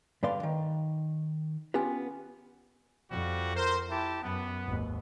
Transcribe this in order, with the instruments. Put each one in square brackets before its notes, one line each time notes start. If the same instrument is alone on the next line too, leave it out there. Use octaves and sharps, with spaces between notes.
[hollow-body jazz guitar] G2 D3 B4 D5 F5 C6
D#3
B3 C#4 F4 G4 B4
[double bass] F2 [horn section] F3 G3 F#4
[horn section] A#4 C5
E4 G4 A5
[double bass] F#2 [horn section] B3
[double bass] G#1 D#2